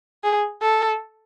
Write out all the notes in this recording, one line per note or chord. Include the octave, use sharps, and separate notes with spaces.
G#4
A4